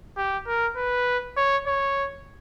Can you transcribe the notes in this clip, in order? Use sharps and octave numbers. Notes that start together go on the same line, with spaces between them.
G4
A#4
B4
C#5
C#5